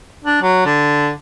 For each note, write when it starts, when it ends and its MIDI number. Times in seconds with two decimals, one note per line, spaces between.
0.24 0.40 62
0.42 0.61 54
0.66 1.11 50